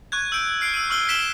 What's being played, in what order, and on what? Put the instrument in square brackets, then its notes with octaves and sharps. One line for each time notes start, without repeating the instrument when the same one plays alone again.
[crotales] C#6 F#6 G#6
E6 G6 D7
F6 C7 D7
E6 D#7
C#6 E6 F6 G7
B6 D7 E7 G7